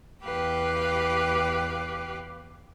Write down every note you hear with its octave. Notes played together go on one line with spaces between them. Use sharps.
E2 G4 B4 F5 G5